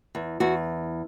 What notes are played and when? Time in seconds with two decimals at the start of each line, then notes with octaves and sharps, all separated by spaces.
0.15 E2
0.40 E2 F#4